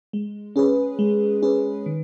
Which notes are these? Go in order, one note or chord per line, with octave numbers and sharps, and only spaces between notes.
G#3
C#4 G#4 B4
G#3
C#4 G#4 B4
D#3